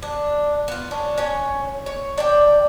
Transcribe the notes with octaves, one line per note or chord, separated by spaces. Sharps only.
D4
B3 F4
C#4 D4
C#4 C#5
C#5
D4 D5 G5